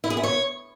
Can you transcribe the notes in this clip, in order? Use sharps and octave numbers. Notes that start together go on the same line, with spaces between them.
E4
G#4
E4
C#5